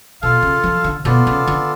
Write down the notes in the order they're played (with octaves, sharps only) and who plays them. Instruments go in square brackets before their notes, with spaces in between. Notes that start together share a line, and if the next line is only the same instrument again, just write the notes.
[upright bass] B2 [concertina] F4 A4 F5
[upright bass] C#3
F3
D3
[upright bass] B2 [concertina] B3 F4 A4 D5
[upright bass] C#3
D3